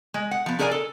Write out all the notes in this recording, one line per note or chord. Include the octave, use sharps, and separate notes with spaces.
G#3
F#5
F3 B3
D4 G#4 A#4 D5 F#5 G#5
A4